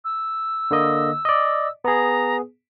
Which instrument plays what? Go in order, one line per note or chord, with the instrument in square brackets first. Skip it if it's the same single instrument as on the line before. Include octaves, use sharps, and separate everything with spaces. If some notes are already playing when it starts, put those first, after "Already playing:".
[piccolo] E6
[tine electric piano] D3 A#3 D#5
D5 D#5
[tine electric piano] B3 G#4 [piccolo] A#5